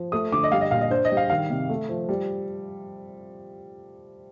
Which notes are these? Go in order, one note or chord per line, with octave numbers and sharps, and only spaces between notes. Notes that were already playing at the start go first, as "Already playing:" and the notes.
Already playing: F3
A3 D#6
D3 D6
D#5
G3 F5
D#5
A#2 F5
D#5
D4 C5
D#5
G3
F5
D#3 F5
C3
A3
F3
G3